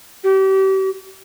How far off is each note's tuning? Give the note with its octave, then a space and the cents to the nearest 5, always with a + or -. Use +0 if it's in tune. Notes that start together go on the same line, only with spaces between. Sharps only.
G4 -35